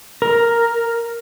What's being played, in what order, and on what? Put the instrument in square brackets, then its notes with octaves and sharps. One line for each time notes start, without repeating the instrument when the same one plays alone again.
[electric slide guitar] A#4